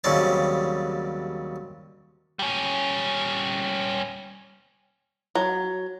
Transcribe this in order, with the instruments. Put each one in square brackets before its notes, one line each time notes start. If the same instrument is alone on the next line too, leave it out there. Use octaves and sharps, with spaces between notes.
[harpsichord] D#2 C#3 F#3 G3 C4 A5
[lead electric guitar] G3 C#4
[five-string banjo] F#3